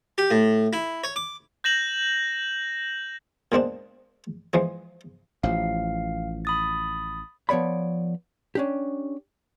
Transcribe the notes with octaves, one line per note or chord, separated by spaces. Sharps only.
G4
A2
E4
C#5
D6
G6 A#6 E7 F#7
A#2 G#3 C4 D4
E3 F3 G#3
A1 F3 F5
B5 D#6 A6
F3 B3 C#5 D5 B5
C#4 D4 G4